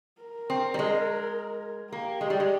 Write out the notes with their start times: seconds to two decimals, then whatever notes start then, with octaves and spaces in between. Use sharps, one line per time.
0.21 A#4
0.50 C4
0.74 G3
0.79 G#3
1.93 A#3 G4
2.21 G#3
2.30 G3
2.40 G#3